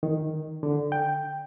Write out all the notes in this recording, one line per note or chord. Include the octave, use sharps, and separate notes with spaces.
D#3
D3
G5